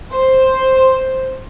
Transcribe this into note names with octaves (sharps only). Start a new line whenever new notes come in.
C5